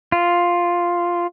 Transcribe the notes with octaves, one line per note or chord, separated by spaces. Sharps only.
F4